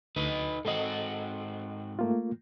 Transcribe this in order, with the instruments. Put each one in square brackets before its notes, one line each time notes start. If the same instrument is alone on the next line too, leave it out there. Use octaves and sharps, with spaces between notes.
[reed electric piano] D2 [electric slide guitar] D#4 B4 D#5
[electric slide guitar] G#2 C4 F#4 [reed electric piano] A4 D#5
[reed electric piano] A3 A#3 F4